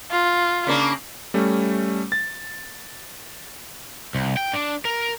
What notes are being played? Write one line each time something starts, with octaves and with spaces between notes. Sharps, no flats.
F4
C#3 A#3 D4
G3 A3 C#4
A6
C2
G5
D4
A#4